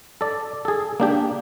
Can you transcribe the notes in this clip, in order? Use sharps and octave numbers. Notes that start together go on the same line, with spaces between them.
A4 D5
G#4 A4
A#3 D4 G4